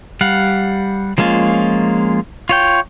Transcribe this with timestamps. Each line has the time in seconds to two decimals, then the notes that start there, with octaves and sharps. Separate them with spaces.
0.21 G3 F5 F#5
1.18 F3 G#3 A#3 C#4 F4
2.49 F4 C#5 G5